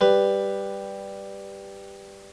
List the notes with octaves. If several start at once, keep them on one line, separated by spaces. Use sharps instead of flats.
G3 B4